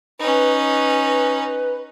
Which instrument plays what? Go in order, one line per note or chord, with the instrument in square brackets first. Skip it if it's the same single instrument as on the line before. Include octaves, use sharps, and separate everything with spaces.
[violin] C#4 D#4 [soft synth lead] B4